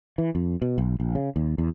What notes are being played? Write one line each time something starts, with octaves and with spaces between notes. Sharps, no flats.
E3
F2
B2
B1
A#1
C#3
D#2
E2